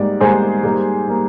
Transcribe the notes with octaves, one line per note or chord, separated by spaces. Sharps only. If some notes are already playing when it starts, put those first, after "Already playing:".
Already playing: G#2 G3 A#3 D5
G#2 G3 A#3 G#4 C5
G#2 G3 A#3
G3 A#3